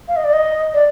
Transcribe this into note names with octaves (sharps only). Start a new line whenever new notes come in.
F5
D#5
D5
D#5
D5